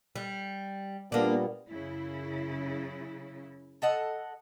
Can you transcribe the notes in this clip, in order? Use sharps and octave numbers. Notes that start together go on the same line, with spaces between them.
G3
A#2 G3 A#3 B3 D4
F#2 C#3 E4
A4 D#5 F#5